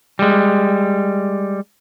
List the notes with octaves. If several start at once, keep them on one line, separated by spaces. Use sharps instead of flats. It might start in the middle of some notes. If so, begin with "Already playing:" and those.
G3 G#3